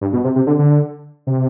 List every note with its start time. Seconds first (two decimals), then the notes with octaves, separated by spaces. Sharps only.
0.01 G2
0.13 B2
0.24 C3
0.36 C3
0.47 D3
0.59 D3
1.27 C3